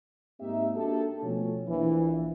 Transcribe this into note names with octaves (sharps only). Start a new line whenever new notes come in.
G#2 A#3 C4 D#4 G4 E5
A#3 D4 F#4 G4 A4
B2 F3 A3 C#4
A#1 E3